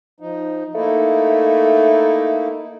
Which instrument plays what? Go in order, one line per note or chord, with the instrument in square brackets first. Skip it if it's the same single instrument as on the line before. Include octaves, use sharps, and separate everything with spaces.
[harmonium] F3 D#4
[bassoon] A3 [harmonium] A#3 D#4 E4